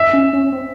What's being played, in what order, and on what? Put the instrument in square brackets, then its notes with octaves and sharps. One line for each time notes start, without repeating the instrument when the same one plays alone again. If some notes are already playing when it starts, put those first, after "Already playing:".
Already playing: [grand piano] E5
[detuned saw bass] C#4
C#4
C4